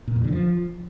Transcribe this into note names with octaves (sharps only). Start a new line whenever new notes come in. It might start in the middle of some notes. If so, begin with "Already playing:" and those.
A#2
F2
D3
F3